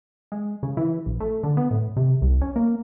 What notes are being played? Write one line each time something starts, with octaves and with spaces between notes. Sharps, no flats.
G#3
C#3
E3
A#1
A3
D3
B3
A2
C3
C2
C#4
A#3